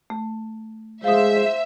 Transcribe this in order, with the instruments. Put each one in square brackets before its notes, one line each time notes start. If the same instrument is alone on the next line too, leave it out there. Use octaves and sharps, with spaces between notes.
[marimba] A3
[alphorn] G#3 [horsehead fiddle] C5 [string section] E5 [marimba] F5 D#6